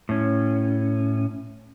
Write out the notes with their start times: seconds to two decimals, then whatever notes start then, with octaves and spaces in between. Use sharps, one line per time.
0.09 A2 C#4